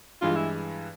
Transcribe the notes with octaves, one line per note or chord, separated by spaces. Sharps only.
G2 E3 G#3 F4
E4